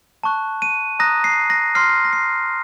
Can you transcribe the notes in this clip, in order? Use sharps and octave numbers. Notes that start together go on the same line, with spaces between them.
A5 C#6 F#6
D#7
A#5 D#6 F#6 A#6
C7
A#6
C6 F6 C7
A#6
C7